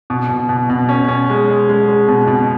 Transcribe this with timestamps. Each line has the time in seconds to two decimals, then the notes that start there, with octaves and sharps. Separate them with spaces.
0.10 B2
0.30 B2
0.49 B2
0.70 B2
0.89 C#4
1.08 C#4
1.29 G#3
1.48 G#3
1.69 G#3
1.88 G#3
2.08 B2
2.27 B2